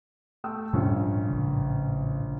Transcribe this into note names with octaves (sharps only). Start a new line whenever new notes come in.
A3 G5 E6
A#1 G#2 G3 C#4 F4
A1 C#3